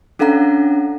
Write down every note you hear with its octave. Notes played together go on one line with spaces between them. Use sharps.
C#4 D4 A4 F5 F#5 A#5